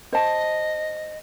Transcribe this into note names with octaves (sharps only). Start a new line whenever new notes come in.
C5 D#5 A5